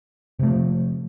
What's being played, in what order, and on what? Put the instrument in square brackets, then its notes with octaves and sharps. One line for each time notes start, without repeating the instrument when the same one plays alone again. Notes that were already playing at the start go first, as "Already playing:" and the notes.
[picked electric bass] C3
A3
F3